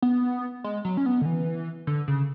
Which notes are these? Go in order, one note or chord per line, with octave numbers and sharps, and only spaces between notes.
B3
G#3
F#3
C#4
B3
D3
E3
D3
C#3